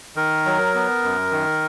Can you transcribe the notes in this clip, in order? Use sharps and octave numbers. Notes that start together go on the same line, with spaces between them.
D#3 A#4
F#3
B3
F#2
D#3